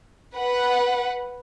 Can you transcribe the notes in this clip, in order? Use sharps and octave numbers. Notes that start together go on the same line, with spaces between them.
B4 F#5